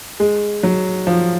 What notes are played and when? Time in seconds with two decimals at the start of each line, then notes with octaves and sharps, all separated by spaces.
0.20 G#3
0.63 F#3
1.07 F3